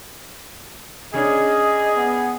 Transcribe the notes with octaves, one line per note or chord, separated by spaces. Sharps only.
C#3 C#4 D4 G#4 D#5
B3